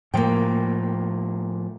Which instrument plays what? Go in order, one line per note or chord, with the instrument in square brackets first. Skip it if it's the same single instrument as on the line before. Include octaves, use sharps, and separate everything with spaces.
[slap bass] A2 F3 [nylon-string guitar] A#3 G5